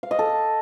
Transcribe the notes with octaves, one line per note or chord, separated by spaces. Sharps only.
F5
D#5
A4